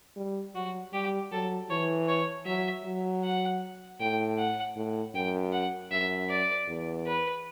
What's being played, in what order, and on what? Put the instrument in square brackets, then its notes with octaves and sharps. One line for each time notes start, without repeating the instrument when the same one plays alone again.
[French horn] G3
[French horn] F#3 [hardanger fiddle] F#4
[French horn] G3 [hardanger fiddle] G4
[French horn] F#3 [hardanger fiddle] A4
[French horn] E3 [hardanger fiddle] C#5
[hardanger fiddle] C#5
[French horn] F#3 [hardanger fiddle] E5
[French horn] F#3
[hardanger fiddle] F#5
[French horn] A2 [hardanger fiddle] G5
[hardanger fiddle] F#5
[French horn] A2
[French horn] F#2 [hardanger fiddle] G5
[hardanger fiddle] F#5
[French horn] F#2 [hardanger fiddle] E5
[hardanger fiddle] D5
[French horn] E2
[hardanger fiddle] B4